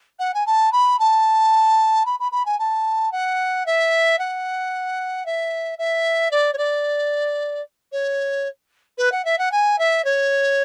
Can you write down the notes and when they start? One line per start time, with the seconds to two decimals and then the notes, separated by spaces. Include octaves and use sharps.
0.19 F#5
0.34 G#5
0.46 A5
0.72 B5
0.99 A5
2.05 B5
2.19 B5
2.32 B5
2.45 G#5
2.59 A5
3.12 F#5
3.66 E5
4.19 F#5
5.26 E5
5.78 E5
6.31 D5
6.53 C#5
6.58 D5
7.92 C#5
8.98 B4
9.12 F#5
9.25 E5
9.38 F#5
9.52 G#5
9.78 E5
10.04 C#5